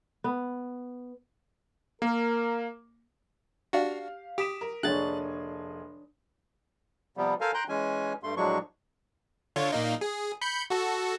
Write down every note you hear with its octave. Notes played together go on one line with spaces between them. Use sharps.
B3
A#3 A#4
D4 F#4 G4 F5
G4 D#6 B6 E7
A#4
F1 A#3 D4 G#4 C#5 F#6 A6
C3 F3 G3 B3
A4 A#4 C5 F5 G#5 F6
G5 A#5 C6 F#6 G6
E3 G#3 C#4 G#5
G2 A3 C6
A2 F3 F#3 G#3 D4 C#6
D3 F4 C#5
A#2 A#3 D#4
G#4
B5 G6 C#7
F#4 A4